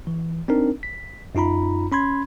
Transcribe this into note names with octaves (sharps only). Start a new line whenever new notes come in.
E3
C4 D4 D#4 A#4
B6
F#2 D#4 F4 A#5 B5
C#4 B5 C6 G#6